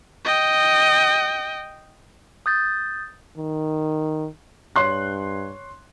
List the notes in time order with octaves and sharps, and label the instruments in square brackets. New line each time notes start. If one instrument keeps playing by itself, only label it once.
[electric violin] D#5 G5
[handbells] D#6 G6 A6
[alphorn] D#3
[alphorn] G2 [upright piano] C#5 C6 F#6